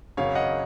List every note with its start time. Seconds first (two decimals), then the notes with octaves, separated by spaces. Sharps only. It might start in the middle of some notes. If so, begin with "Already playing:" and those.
0.17 G#1 F#2 C#3 F#3 C#5 F5
0.35 D#5 F#5